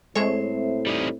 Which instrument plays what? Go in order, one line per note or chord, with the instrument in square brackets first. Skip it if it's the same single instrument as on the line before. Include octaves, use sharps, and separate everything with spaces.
[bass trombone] A2 [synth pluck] G#3 A4 C#5 [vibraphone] C4 C5 E5
[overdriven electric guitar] G3 D#4